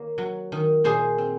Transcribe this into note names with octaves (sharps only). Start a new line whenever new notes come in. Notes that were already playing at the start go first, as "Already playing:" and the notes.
Already playing: D#3 A#3 A#4 C#5
F#3
D#3
A#2 G#4 C5
C4